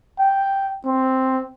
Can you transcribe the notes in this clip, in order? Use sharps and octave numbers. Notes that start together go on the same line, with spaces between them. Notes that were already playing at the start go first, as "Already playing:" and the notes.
G5
C4